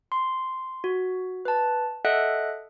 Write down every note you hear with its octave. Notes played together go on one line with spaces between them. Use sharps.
C6
F#4
B4 A5
A4 D#5 E5 F#5 F#6